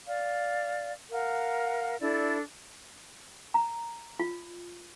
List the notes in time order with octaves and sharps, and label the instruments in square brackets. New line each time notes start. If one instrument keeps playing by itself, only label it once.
[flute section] D5 F5
A#4 F5 F#5
D4 E4 A4 D5
[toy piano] A#5
F4